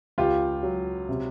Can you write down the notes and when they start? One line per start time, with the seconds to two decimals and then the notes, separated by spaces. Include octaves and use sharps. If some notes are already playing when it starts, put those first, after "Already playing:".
0.18 C#2 F4 G4
0.63 F#3
1.09 C3